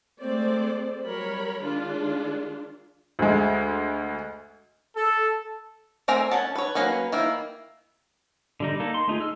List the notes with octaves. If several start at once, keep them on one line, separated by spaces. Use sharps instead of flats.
G#3 A3 C4 C5 D5
F#3 G3 A#4 C#5 B5
D#3 G#3 D4 F4
D2 G#3
A4
A3 C4 A#4 G#5 A#5
C#4 F#5 A5
B4 C#5
F#3 A#3 C#4 B4
D#3 A#3 E4
D3 G3 D#4
A#3 D#4 A4
C6
A3 D#4 F4 G#4
E6 F6